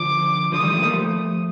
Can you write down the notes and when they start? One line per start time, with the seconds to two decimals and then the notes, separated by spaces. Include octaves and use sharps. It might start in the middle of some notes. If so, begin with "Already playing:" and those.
Already playing: D3 F3 D6
0.52 D3 F3 D#6
0.63 D#3 G3
0.72 F3 A3
0.82 G3 A#3
0.92 F3 A3